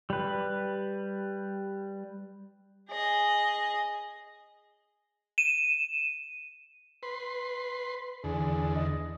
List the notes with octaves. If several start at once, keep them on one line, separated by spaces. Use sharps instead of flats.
G3 B4
G#4 D#5
D#7 E7
B4 C6
E2 D3 G#4
D#5